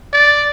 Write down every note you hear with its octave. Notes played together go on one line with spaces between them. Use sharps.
D5